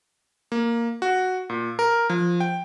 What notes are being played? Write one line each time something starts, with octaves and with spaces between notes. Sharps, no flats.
A#3
F#4
A#2
A#4
F3
G5